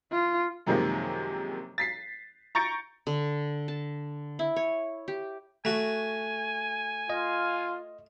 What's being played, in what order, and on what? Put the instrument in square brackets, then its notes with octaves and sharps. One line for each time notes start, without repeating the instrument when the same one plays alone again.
[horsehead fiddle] F4
[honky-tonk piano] F#2 C3 D#3 F3 G#3 A#3
A6 B6 C7
A#5 C#6 G6 A6 C#7 D7
[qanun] D3
A5
E4
C#5
G4
[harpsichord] A3 F#4 [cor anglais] G#5
[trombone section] F4 [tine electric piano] D#5